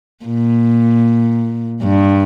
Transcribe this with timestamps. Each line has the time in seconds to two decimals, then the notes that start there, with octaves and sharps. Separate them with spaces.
0.25 A#2
1.83 G2